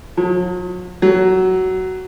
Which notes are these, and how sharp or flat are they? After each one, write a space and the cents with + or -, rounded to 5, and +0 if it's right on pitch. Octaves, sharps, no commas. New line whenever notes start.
F#3 -45
F#3 +15